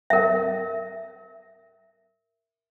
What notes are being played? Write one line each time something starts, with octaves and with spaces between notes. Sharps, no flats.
A#4 E5